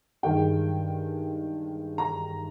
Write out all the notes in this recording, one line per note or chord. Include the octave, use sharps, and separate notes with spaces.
G2 D#3 G#3 G5
A#5